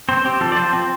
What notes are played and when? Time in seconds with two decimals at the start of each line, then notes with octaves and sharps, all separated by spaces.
0.09 C4 C5
0.25 C4 G4
0.41 F3 A4
0.52 D5
0.56 F3 C5
0.73 C4